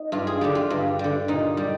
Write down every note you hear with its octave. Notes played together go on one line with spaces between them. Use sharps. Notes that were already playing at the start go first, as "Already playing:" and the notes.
Already playing: D#4
G2 F4
G#4
D3 G3 G4
F4
G2
D3 G3
A#2 D#4
G3